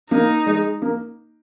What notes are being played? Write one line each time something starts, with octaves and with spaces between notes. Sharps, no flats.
A#3 D#4
G#3
A#3